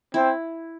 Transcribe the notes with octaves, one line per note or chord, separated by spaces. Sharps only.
C4 E4